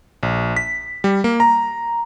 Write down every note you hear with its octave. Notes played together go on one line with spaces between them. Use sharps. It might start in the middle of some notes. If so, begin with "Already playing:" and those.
A#1
B6
G3
A#3
A#5